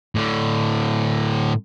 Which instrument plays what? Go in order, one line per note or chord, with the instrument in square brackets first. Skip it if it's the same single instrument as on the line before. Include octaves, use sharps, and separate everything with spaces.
[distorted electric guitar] A2 D3